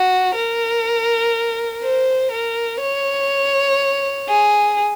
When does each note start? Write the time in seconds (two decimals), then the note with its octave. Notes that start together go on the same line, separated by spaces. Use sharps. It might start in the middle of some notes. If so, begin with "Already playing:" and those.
Already playing: F#4
0.35 A#4
1.83 C5
2.31 A#4
2.81 C#5
4.29 G#4